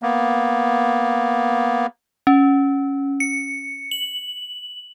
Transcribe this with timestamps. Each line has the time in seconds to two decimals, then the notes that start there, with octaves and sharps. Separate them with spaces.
0.03 A#3 B3
2.27 C#4
3.20 C#7
3.91 F#7